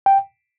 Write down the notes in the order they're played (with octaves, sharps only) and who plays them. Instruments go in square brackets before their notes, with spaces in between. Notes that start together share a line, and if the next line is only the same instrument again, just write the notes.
[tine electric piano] G5